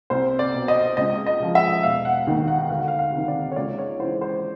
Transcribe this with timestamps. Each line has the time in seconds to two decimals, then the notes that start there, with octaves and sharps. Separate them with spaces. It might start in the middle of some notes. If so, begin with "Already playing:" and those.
0.10 C2 C5
0.39 D5
0.54 B2
0.68 D#5
0.97 C#2 D#5
1.26 D#5
1.40 C#3 F3
1.55 E5
1.83 E1 F5
2.05 F#5
2.27 D#2 D#3 F#5
2.48 F#5
2.70 D2 F5
2.79 F#5
2.88 F5
2.99 F5
3.13 C3
3.18 D#3
3.28 D5
3.52 C#5
3.56 C#2 D5
3.78 C#5
3.99 C#3 E3 C5
4.21 C5